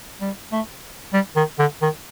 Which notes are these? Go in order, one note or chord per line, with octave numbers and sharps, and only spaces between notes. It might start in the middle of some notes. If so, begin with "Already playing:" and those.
G3
A3
G3
D#3
D3
D#3